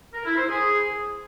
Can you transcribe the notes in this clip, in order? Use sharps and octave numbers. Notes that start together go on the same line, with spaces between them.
A#4
E4
C5
G#4